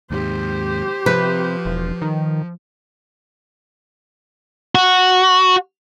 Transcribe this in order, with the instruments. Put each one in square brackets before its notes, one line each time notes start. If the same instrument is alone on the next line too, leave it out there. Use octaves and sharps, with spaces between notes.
[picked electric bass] D#2 G#2 [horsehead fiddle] G4 C5
[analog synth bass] C3 [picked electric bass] F3 [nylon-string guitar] B4
[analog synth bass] E1
D#3
[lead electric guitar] F#4